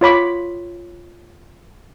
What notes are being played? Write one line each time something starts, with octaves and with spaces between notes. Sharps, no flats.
F4 C#5 B5 D6